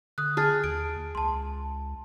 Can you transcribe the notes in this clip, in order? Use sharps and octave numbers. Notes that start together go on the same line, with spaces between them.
D3 D#6 F#6
G#4 A5 F6 A6
D#2 D7
C#2 A5 C6